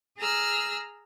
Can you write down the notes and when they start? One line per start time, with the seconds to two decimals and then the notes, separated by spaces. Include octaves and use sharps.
0.18 G#4 A#5 E6 F6